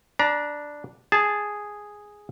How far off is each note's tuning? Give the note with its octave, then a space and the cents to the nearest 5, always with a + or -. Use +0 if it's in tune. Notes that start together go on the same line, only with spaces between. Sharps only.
D4 +0 A#5 +35
G#4 +0 A5 -15